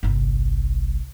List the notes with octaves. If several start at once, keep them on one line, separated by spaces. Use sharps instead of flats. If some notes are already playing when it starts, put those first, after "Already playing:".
G1 C2